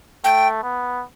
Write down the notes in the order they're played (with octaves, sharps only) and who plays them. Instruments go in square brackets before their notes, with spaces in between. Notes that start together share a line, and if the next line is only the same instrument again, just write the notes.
[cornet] A3 [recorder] G5
[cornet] B3